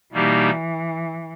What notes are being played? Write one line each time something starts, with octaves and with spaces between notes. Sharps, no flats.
B2 E3 G3 A#3 D#4 G4